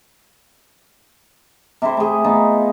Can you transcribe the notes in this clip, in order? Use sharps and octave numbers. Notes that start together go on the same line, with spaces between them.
C3 E4 C5
A3 G#4
B3 D#4 F4